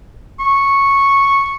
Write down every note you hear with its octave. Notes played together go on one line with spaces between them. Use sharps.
C#6